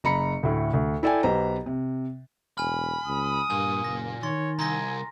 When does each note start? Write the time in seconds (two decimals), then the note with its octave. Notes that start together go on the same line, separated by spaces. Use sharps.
0.04 F#1 A#5 B5 C#7
0.43 D2 A2
0.74 D2
1.03 E4 A4 D5 G5 G#5
1.23 B1 G4 B4 C5 A#5
1.66 C3
2.58 E1 G#5 B5 F6
3.06 C#2 D#6
3.50 G2 A#2 G#5
3.84 F#1 A#6
4.23 D#3 C#5 C6 A6
4.59 C2 G#5 A#5 C6 A#6